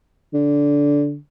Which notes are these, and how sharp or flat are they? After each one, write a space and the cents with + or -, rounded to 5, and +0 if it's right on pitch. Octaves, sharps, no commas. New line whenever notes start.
D3 -15